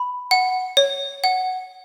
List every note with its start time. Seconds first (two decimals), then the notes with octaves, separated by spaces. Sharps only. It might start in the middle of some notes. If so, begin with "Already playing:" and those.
Already playing: B5
0.31 F#5
0.77 C#5
1.24 F#5